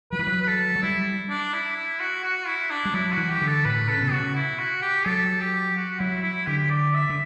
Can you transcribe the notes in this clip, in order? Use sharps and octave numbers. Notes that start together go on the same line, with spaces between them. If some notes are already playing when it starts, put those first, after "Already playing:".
F#3 B4
E3
F#3
B4
A4
F#3
G3 E4
D4
E4
E4
F#4
F#4
E4
D4
G3
F#3 E4
F#4
E3
G4
D3
A4
A2 B4
C#3 A4
B2
C#3 F#4
E4
F#4
G4
F#3 A4
G4
F#4
F#3 E4
E4
D3 G4
D5
E5
D3